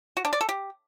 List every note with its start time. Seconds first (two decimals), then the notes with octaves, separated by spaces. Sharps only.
0.17 F#4
0.25 D4
0.33 D5
0.41 A4
0.49 G4